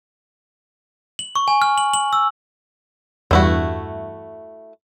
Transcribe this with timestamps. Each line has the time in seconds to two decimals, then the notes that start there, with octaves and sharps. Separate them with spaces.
1.19 F#7
1.36 C#6
1.48 G#5
1.62 F6
1.78 F#7
1.94 F#7
2.13 E6
3.31 E2 G2 A3 E4 F#4